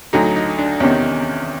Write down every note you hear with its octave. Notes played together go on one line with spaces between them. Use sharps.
D2 D3 F#3 D#4
D#4
D4
E2 C3 D#3 C#4